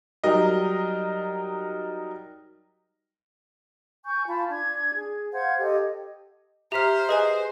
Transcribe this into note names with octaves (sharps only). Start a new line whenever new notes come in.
F#3 G3 D#4 A#4 D#5
G#5 C#6 G6
F4 A5 B5
D4 G#6
G#4
C5 F5 F#5 G#6
G4 A4 D#5
G4 C5 E5 A#5 F6 B6
G#4 B4 D#5 G#5